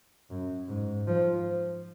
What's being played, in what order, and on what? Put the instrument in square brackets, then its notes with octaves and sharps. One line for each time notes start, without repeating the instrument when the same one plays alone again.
[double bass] F#2
G#2
F3